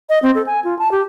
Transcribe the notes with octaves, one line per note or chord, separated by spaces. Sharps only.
D#5
C4
A4
G#5
F4
A5
G4